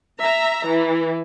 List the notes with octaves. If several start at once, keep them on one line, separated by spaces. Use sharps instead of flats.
E5 A#5
E3